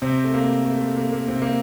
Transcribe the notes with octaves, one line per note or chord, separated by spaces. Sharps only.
C3 C4
A3
A#3
A3
A3
A#3
A#3
C3 C4
A#3